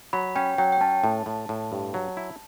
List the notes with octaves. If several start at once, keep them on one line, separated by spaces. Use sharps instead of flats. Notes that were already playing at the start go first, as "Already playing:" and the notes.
F#3 B5
C#4 G5
F#3 G5
G5
C#4 A5
A2
A2
A2
G2
F#3
E4